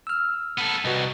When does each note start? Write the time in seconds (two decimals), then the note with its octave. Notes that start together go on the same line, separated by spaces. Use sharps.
0.07 E6 F6
0.58 B3 A4
0.85 C2 F#4 B4 D#5